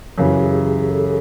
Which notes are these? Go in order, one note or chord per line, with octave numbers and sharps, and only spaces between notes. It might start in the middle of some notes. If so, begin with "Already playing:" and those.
F#2 C#3 E3 G4
G#4
G#4
A4